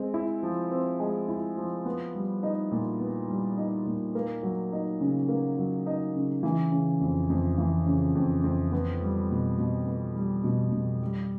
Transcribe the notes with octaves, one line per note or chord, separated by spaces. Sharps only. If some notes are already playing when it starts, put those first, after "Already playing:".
Already playing: G#3 C4
E4
F3
C4
G#3
E4
F3
B3
G3
D#4
A#2
B3
G3
D#4
A#2
A#3
F#3
D#4
C#3
A#3
F#3
D#4
C#3
E3
C#3
F2
F2
E3
C#3
F2
F2
B3
G3
B2
B2
B3
G3
B2
B2
G3